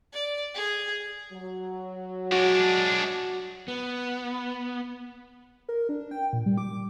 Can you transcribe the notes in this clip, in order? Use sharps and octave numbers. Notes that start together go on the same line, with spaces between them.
D5
G#4
F#3
G#3 D4 F#4
B3
A#4
D4
G5
A#2
G3
D6